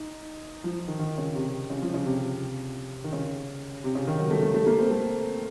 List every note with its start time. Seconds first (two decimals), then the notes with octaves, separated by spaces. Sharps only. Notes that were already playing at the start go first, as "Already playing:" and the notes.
Already playing: D#4
0.64 F3
0.88 D#3
0.99 D#3
1.18 C#3
1.35 C3
1.70 C#3
1.82 F3
1.94 C#3
2.06 C3
2.23 C3
3.04 D#3
3.13 C#3
3.84 C3
3.95 C#3
4.07 D#3
4.19 F#3
4.31 A3
4.43 A3
4.54 A3
4.67 A#3
4.78 C4
4.90 A3